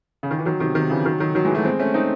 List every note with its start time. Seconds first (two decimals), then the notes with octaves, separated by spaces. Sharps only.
0.23 C#3
0.31 D#3
0.39 E3
0.45 D#3 F#3
0.60 C3 D#3
0.75 C3 D#3
0.90 C#3 E3
1.05 D#3 F#3
1.20 D#3 F#3
1.35 D#3 F#3
1.45 E3 G#3
1.55 F#3 A3
1.64 G#3 C4
1.79 A3 C#4
1.94 C4 D#4